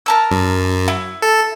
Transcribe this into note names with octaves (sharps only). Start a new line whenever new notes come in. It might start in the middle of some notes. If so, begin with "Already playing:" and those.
A#4 A5 E6
F#2
E4
A4